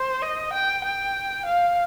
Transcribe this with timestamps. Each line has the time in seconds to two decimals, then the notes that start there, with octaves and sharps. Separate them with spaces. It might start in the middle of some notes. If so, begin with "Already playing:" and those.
Already playing: C5
0.22 D#5
0.53 G5
0.84 G5
1.45 F5